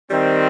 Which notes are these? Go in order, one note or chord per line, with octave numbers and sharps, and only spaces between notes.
D#3 G3 C4